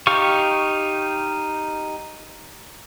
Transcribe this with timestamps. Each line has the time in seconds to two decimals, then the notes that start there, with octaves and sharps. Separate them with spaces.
0.07 D#4 G4 F5 C#6